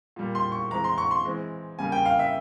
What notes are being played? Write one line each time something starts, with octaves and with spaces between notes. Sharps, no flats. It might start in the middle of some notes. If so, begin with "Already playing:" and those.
A#2 G3 A#3
C6
C#6
E3 G#3 C4 A#5
C6
C#6
C6
E3 G#3 C4
C#3 G3 A#3 G#5
G5
F5
E5